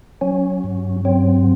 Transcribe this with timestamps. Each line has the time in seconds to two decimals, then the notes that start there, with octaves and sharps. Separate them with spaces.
0.21 F#3 C#4
0.64 G2
1.05 F#3 C4